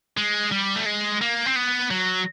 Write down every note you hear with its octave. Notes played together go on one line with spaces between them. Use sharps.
G#3
G3
A3
G#3
A#3
C4
B3
F#3